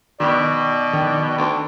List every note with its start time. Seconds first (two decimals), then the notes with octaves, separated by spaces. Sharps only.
0.20 B2 D#3 D5
0.93 D#3
1.38 D2